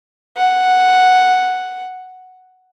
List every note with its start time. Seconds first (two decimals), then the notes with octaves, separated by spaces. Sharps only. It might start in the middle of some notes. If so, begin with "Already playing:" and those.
0.37 F#5